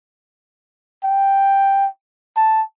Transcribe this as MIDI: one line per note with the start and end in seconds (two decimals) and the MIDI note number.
1.04 1.87 79
2.37 2.62 81